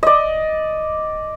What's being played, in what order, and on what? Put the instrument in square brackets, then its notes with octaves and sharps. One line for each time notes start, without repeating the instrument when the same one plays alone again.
[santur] D5 D#5